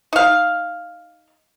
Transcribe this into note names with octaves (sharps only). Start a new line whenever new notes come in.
D#4 F5